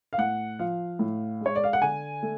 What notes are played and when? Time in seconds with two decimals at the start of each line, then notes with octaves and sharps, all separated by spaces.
0.13 F5
0.18 A2 F#5
0.59 F3 F5
0.99 A2
1.41 G#3 C#5
1.56 D5
1.64 F5
1.73 F#5
1.82 D3 G#5
2.23 A3